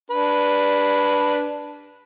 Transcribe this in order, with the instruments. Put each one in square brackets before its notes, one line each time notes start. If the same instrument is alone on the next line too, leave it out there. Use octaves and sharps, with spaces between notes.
[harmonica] D4 B4